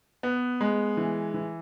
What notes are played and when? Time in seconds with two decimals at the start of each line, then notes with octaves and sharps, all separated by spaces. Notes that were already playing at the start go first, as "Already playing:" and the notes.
0.23 B3
0.61 G#3
0.97 E3
1.34 E3